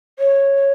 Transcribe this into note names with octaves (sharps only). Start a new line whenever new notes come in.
C#5